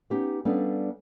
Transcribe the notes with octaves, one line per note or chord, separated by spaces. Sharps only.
B3 C#4 D#4 G4
G3 B3 C#4 D4 A4 F5